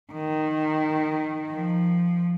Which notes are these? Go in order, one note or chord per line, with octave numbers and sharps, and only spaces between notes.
D#3
F3